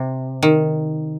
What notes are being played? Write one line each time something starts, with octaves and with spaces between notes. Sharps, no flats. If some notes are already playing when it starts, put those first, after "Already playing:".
Already playing: C3
D#3